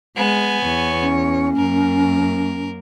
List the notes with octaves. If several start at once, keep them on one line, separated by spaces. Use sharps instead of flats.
G#3 B3 G#5
E2 C#5
C#4
F#2 A#3 A#4